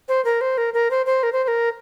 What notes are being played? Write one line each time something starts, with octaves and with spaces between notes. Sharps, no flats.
C5
A#4
C5
A#4
A#4
C5
C5
A#4
C5
C5
A#4